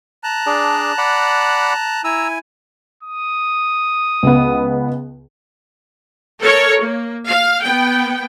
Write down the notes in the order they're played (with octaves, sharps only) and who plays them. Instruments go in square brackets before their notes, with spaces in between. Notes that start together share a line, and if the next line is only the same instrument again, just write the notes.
[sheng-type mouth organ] A5 A#5 F#6
[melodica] D4 G#4 D5
D5 F#5 B5
[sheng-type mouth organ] E4 G#5 [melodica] A#5 E6
[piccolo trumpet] D#6
[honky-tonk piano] C#2 B3
[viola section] A4 A#4 C#5
A#3
F5
B3 G5